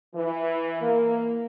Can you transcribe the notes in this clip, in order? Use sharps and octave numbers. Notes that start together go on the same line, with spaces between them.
E3
A#3